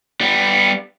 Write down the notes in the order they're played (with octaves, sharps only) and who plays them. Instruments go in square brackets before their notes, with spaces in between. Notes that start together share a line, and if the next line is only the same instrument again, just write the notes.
[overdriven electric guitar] G3 B3